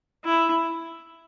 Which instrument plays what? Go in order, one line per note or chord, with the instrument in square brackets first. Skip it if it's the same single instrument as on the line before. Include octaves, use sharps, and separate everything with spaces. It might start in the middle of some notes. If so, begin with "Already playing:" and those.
[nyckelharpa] E4